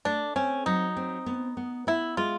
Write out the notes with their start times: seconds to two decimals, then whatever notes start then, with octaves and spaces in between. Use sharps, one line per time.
0.05 A3 D4
0.36 C4 C#4
0.66 F#3 D#4
0.97 C4
1.26 B3
1.57 B3
1.87 B3 E4
2.17 G#3 F4